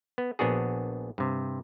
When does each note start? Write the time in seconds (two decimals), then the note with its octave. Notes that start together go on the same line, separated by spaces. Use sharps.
0.18 B3
0.39 A#1 B3 D4 F#4 G#4
1.18 G2 C3